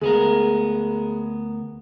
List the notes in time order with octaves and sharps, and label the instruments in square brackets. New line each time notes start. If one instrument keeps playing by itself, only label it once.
[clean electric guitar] D2 B3 A#4 [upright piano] G#3